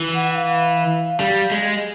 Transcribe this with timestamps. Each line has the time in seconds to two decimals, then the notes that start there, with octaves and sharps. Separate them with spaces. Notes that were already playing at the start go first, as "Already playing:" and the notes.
Already playing: E3
0.15 F#5
0.31 F#5
0.35 F5
1.20 G3
1.52 G#3